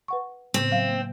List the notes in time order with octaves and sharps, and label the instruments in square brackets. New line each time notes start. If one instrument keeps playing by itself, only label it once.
[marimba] B4 F#5 C#6
[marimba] A2 C#3 B3 [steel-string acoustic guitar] C4
[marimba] F#3 F5
A#3